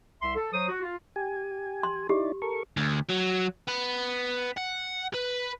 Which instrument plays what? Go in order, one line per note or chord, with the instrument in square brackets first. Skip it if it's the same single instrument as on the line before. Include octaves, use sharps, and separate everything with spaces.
[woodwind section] C2 E5 C6
A4
F#3 C5 D#6
F#4
F4
[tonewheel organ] G4 G#5
[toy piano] C6
[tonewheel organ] D#4 E4 D5 [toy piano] G4
[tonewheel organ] A4 A#4 C#6
[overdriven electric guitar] D2
F#3
B3
F#5
B4